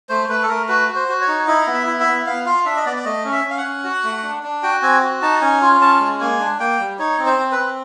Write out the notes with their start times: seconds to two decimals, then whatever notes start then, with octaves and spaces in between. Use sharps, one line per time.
0.09 A3 C5
0.29 A3 B4
0.43 A4
0.49 A3 A#4
0.68 F#4 B4
0.88 F#4
0.95 C5
1.08 F#4
1.21 C#5
1.27 D#4
1.47 E4 D#5
1.67 B3
1.74 E5
1.87 E4
2.00 E5
2.07 B3
2.26 B3 F5
2.46 F4 F5
2.66 D4 E5
2.76 D#5
2.86 B3 D5
2.96 D5
3.05 A3 D#5
3.25 C#4
3.32 E5
3.44 C#4
3.50 F5
3.58 F#5
3.64 C#4
3.84 F#4
4.04 A3
4.23 D4
4.43 D4
4.63 F#4 G5
4.82 C4 G#5
5.02 F#4
5.22 D#4 A5
5.41 C#4 G#5
5.61 F4
5.81 C#4 A5
6.00 G#3
6.20 A#3 G#5
6.40 D4
6.60 A#3 G5
6.79 G3
6.99 D#4 C#5
7.19 C4
7.26 C5
7.38 C4
7.52 B4
7.58 C4